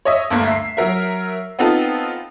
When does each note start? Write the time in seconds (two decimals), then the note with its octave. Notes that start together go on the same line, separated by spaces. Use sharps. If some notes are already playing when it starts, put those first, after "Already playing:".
0.05 C#5 D#5 E5
0.31 D2 G2 A3 A#3
0.47 E5 C7
0.77 F#3 A#4 E5
1.59 B3 C4 D#4 F4 A4